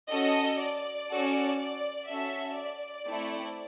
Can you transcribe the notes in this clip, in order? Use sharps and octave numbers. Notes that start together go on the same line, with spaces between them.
C#4 F#4 A4 D#5
D5
C#4 F#4 A4
D5
C#4 F#4 A4 E5
D5
A3 C4 E4 A4